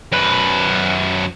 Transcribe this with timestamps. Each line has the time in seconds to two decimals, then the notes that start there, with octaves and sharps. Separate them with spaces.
0.12 F#2 B4